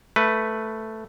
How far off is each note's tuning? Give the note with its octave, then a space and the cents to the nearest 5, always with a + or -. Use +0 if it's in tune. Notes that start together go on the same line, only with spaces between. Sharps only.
A3 +0 B4 +0